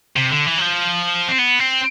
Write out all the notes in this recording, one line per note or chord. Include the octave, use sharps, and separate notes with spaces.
C3
D3
E3
F#3
F3
C4
B3
C4